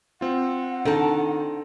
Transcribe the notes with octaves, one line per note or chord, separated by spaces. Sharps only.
C4 F4 F#5
D#3 D4 A4 A5